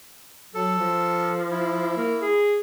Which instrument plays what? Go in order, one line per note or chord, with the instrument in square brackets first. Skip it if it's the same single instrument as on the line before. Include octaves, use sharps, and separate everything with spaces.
[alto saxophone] F#3 [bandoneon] A4
[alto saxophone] F3
[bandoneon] E4
[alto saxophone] A#3
G#4